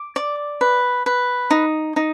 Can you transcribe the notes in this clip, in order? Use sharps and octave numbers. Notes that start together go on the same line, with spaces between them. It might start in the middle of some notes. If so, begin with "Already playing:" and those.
Already playing: D6
D5
B4
B4
D#4
D#4